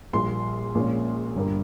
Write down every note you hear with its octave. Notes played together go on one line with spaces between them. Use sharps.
A#1 A#2 G3 C6
A#1 A#2 G#3 C#4
G1 G2 G3 A#3